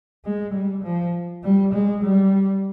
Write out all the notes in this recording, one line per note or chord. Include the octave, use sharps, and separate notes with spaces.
G#3
G3
F3
G3
G#3
G3